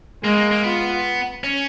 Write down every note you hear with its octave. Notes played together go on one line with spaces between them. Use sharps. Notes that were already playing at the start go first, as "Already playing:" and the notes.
G#3 A#3
A#3
A#3
B3 F4
C#4